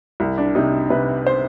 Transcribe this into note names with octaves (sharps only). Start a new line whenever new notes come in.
C2
D4
C3 D#4
C3 B4
C5